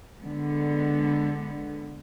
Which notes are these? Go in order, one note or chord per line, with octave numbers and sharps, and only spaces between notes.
D3 G#3 B3